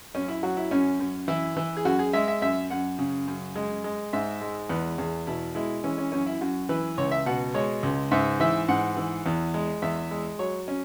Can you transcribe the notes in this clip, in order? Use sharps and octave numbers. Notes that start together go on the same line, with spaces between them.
F#2 C#4
E4
F#3 F#4
E4
F#2 C#4
F#2
E3 E4
E3
G#4
F#2 F#4
G#4
G#3 E5
E5
F#2 E5
F#2 F#5
C#3
F#2
G#3
G#3
G#2 E5
G#3
E2 B4
E2 G#4
B2 E4
G#3 E4
E3 C#4
C#4
F#2 C#4
E4
F#2 F#4
E3 B4
C#2 C#5
E5
B2 F#5
G#3 C#5
C#2
G#2 E5
E3 E5
G#2 F#5
E3
E2
G#3
E2 E5
G#3
F#3 C#5
C#4